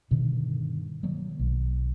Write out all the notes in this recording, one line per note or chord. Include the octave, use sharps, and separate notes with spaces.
G2 B2 D3 D#3
D#3 F#3 A#3
B1